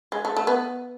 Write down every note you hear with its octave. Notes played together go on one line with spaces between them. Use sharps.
G#3
A3
A3
B3